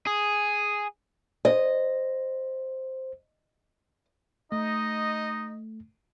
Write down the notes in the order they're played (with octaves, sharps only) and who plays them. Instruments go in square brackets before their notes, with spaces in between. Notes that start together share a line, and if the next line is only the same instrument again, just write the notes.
[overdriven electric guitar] G#4
[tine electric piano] C5 [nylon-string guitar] D#5
[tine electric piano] A3 [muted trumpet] D#4 [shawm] D#5